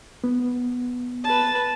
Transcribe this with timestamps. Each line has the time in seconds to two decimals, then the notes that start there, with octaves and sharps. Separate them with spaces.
0.24 B3
1.24 B4 A5